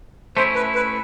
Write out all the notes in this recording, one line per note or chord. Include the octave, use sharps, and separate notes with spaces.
A3 C#4 E4 C5
B4
B4